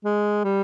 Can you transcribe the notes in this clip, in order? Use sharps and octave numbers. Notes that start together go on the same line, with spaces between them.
G#3
G3